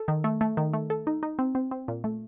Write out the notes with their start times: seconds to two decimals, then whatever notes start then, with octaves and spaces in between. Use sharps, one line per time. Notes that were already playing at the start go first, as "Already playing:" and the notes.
Already playing: A4
0.08 D#3
0.24 A3
0.41 A3
0.57 D#3
0.73 A3
0.90 A4
1.07 D#4
1.23 D#4
1.39 C4
1.55 C4
1.71 C4
1.88 A#2
2.04 A3